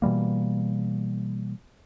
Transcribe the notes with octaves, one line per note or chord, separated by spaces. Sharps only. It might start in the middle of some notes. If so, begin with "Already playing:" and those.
B2 E3 G3 A#3